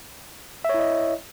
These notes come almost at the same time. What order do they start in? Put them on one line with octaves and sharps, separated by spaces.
E5 C#5 E4 D#5